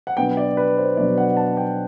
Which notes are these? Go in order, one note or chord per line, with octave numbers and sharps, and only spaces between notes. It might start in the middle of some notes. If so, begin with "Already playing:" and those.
F#5
B2 F#3 B3 D4 G5
D5
B4
C5
B2 F#3 B3 D4 D5
F#5
A5
G5